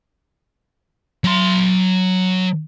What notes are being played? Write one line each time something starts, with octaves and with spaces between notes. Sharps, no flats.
F#3 C6